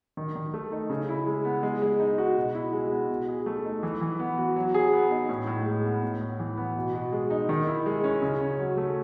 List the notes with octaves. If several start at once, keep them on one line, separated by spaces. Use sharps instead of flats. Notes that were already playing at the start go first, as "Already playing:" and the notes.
D#3
D#3
A3
D#4
C#3
E4
G#3
B3
G#3
G#3
D#4
F#4
B2
E4
G#3
B3
B2
G#4
A3
D#4
E3
E3
B3
F#4
F#3
G#4
B3
D#4
A2
A2
G#3
B3
A2
A2
E3
B3
B2
B2
G#3
D#4
D#3
E4
G#3
C#4
C#3
C#4
F#3
A3